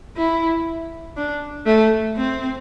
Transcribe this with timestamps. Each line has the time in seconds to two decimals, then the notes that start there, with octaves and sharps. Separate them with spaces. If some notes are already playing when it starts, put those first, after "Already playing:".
0.17 E4
1.17 D4
1.66 A3
2.16 C4